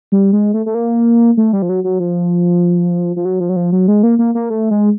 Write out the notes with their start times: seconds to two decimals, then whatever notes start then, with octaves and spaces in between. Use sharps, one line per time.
0.12 G3
0.33 G#3
0.54 A3
0.66 A3
0.74 A#3
1.37 A3
1.53 G3
1.62 F3
1.69 F#3
1.84 F#3
2.00 F3
3.16 F3
3.25 F#3
3.40 F3
3.49 F#3
3.56 F3
3.72 F#3
3.88 G#3
4.03 A#3
4.19 A#3
4.35 A#3
4.50 A3
4.71 G#3